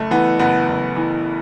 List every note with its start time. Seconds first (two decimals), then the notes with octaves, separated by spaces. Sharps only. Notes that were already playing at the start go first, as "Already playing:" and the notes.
Already playing: F#1 A3
0.11 E3 B3
0.39 F#1 B3
0.68 F#1
0.96 E3